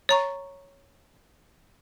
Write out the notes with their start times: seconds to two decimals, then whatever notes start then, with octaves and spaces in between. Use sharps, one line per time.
0.09 C#5 A#5 C#6